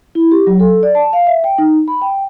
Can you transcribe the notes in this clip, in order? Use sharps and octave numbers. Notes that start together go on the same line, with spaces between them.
E4
G4
F#3
A4
D5
A5
F5
E5
G5
D#4
B5
G5